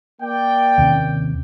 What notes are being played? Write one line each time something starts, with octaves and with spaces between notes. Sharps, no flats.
A#3 D5 G5
D#2 C3 C#4